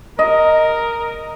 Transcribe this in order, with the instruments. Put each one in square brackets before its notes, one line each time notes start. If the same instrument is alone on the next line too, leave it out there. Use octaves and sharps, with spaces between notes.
[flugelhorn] A#4 [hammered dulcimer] D#5